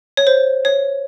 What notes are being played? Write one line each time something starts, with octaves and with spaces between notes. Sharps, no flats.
C#5
C5
C#5